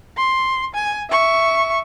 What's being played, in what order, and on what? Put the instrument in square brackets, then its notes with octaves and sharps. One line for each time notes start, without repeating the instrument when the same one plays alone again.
[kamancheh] C6
G#5
E5 C#6